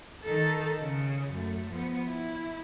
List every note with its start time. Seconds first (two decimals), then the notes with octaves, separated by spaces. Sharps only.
0.24 D#3 A4
0.81 C#3
1.31 F#2 A3
1.71 F3 B3
2.07 E4